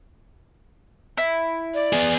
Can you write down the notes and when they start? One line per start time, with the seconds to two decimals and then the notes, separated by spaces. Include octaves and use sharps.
1.17 E4
1.74 D5
1.93 B3 G#4